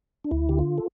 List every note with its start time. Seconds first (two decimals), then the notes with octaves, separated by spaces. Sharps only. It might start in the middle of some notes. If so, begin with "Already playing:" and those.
0.24 D4
0.31 D2 E4
0.49 D3 G4
0.59 F4
0.78 A4